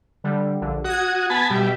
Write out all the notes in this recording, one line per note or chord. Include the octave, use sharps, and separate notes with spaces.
D3 G3
A#1 D3
F#4 D#6 G#6
B3 G#5 A5 B5
B2 G3 E5